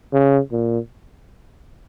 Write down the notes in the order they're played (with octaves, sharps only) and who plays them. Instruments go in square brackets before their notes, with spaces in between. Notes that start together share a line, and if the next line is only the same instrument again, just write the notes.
[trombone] C#3
A#2